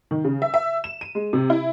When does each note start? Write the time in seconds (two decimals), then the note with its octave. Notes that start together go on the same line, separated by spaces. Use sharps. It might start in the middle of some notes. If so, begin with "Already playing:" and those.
0.11 D#3
0.24 C#3
0.42 E5
0.54 E5
0.84 E7
1.01 D#7
1.15 G#3
1.33 C3
1.50 E4